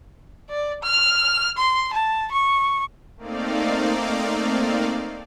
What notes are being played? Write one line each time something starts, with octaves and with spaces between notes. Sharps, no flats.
D5
F6
C6
A5
C#6
A3 A#3 C4 D#4 D5 F5